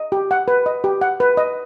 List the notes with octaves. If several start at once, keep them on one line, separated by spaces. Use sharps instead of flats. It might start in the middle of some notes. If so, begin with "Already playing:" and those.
Already playing: D#5
G4
F#5
B4
D#5
G4
F#5
B4
D#5